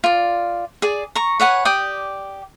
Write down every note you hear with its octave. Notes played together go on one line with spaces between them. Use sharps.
F4 D5
G#4 D5
A#5 C#6
B4 C#5 F#5 G#5
G4 D5 G5 D#6